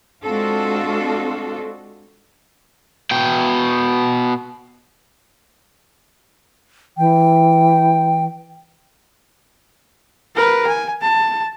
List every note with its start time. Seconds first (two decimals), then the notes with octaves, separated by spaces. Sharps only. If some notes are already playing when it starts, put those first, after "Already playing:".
0.23 G#3 C4 D4 F4 F#4 A4
3.11 B2 G5
6.98 E3 G5
10.36 A#4 B4
10.67 G#5
11.01 A5